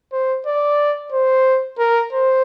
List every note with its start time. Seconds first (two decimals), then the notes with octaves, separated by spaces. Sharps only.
0.12 C5
0.46 D5
1.12 C5
1.79 A#4
2.13 C5